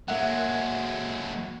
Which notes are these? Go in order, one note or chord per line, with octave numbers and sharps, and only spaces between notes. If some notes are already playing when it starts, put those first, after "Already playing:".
F#3 G#3 A#3 E5 F#5